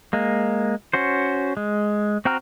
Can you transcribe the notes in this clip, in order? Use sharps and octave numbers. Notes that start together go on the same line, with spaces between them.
G#3 A#3
C#4 F#4 C5
G#3
C4 F#4 G5 A#5 F6